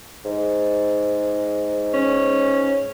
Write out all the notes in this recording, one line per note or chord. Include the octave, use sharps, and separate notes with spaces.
G#2
C#4